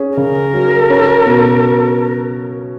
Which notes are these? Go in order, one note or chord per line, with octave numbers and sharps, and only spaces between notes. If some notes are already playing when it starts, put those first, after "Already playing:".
Already playing: C#4 G#4
C#3 A#4
F#3
C#4
B2